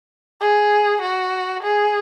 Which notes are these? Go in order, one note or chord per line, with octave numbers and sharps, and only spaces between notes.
G#4
F#4
G#4